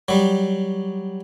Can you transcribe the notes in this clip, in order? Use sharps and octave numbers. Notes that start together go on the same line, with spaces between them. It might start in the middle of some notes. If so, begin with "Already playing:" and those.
F#3 G3